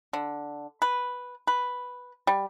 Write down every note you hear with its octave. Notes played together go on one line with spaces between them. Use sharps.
D3
B4
B4
G3